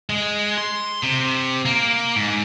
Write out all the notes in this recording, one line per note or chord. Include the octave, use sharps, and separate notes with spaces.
G#3
C6
C3
A#3
G#2